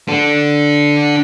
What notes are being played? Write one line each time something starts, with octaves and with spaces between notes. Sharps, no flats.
D4 A4